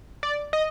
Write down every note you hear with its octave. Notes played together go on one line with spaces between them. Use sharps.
D5
D#5